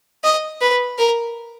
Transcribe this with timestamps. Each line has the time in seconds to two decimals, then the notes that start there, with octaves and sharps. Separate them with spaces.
0.24 D#5
0.62 B4
0.98 A#4